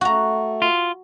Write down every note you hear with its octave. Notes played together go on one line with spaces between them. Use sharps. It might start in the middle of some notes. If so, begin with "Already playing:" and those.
A3 F#4 A#5
F4